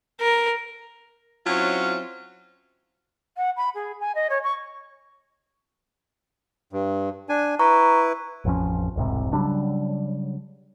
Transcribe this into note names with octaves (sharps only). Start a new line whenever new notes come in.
A#4
F#3 C4 C#4 E4 F4
F#5
B5
G#4
G#5
D#5
C#5
C#6
G2
D4 G#5
E4 B4 A#5 C#6
A1 F2 F3 C#4
E1 C2 G#2 C3
C#3 F#3 G3 D4